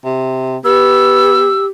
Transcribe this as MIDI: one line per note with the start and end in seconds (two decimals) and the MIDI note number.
0.05 0.57 48
0.65 1.53 59
0.65 1.68 67
0.65 1.65 88